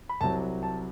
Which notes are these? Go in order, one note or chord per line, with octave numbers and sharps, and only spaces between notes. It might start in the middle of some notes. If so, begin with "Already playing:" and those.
B5
C2 C3 F#3 A5
A5